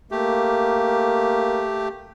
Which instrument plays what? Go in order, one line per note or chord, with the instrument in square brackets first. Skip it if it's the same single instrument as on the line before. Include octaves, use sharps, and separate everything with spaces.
[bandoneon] A3 G4 [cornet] A#3